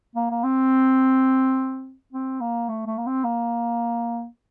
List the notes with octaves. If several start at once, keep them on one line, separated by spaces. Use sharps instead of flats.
A#3
A#3
C4
C4
A#3
A3
A3
A#3
C4
A#3